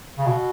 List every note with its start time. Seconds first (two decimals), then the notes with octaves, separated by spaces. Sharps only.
0.18 C#3
0.27 B2